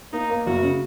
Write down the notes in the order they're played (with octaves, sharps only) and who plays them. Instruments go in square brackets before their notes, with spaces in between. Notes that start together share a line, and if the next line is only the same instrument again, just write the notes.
[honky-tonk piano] A#3 [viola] D#4
[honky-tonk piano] A#3
[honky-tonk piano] F#1 [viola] F#4
[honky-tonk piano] C#3